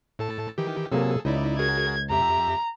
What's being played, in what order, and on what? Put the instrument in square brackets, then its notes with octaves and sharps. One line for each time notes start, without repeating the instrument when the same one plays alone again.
[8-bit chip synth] A2 A4 A5
D#3 E3 G4
[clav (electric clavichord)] C3 F#3 A#3 [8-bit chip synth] G#4 A4 E6
[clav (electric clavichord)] C#2 [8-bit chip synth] D#4 E4 D5
[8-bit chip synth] F#4 G#4 A#4 [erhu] G#6
[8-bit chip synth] F2 G4 E5 [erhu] A#5